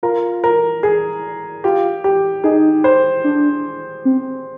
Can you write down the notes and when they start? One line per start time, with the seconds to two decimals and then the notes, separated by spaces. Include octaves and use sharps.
0.03 F4 A#4
0.44 A#4
0.83 G#4
1.64 F4 G4
2.04 G4
2.44 D#4 G#4
2.84 C5
3.24 D4
4.05 C4